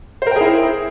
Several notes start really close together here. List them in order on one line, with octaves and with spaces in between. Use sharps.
C5 A#4 G5 G#4 E4